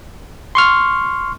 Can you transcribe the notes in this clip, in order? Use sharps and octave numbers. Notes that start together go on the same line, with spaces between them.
C6 C#6 F6